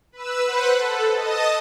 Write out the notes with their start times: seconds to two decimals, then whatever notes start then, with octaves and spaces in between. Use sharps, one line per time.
0.12 B4 E6
0.46 B4 C5 F#5 F#6
0.77 A4
1.15 D#5 A5 D#6